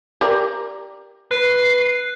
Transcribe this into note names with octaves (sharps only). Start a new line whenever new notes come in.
G4 A#4 D5
B4 F#6 C7